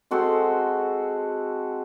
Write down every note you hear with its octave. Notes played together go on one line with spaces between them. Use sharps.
G#3 C4 F#4 A4